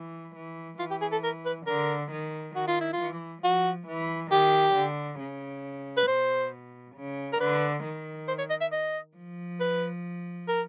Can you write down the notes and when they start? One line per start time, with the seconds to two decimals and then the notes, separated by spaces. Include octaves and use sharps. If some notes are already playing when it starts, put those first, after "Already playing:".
Already playing: E3
0.36 E3
0.79 E3 F4
0.91 G4
1.01 G#4
1.12 A4
1.23 A#4
1.45 B4
1.67 D3 A#4
2.11 D#3
2.55 D#3 F#4
2.67 F4
2.80 E4
2.93 F4
2.99 E3
3.43 F3 F#4
3.88 E3
4.31 D#3 G4
4.76 D3
5.20 C#3
5.97 B4
6.08 B2 C5
6.96 C#3
7.33 A#4
7.40 D3 B4
7.84 D#3
8.28 C5
8.38 C#5
8.50 D#5
8.61 E5
8.72 D#5
9.16 F3
9.60 B4
10.48 A#4